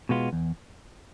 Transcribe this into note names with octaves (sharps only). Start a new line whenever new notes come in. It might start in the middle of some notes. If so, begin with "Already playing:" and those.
B2 G#3 B3 F4
E2